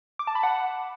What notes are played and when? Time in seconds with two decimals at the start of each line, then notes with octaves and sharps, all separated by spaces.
0.19 D6
0.27 A5
0.35 B5
0.43 F#5